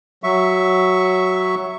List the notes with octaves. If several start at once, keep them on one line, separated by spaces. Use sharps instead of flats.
F#3 E5 C#6